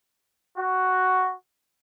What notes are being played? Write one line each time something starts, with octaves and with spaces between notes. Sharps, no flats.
F#4